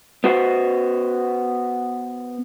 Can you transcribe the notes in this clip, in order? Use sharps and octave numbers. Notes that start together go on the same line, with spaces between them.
B3 F#4 C5